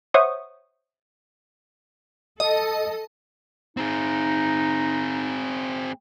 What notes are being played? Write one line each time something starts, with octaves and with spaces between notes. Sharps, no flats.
C5 C#5 E5 F#5 C#6 D#6
A4 D#5
C4 D#4 G#4